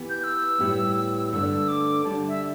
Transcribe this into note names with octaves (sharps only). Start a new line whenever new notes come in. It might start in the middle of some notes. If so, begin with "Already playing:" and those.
Already playing: E3 B3 G4 B4
G6
E6
A2 G3 B3 E4 G4
G2 D3 A3 D4 E6
D6
D3 G3 D4 A5
E5